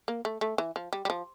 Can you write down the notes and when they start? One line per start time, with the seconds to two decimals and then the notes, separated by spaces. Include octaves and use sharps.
0.08 A#3
0.25 A3
0.41 A3
0.58 E3
0.76 F3
0.93 G3
1.05 G3
1.10 F3